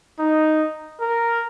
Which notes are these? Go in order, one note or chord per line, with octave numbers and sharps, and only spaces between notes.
D#4
A#4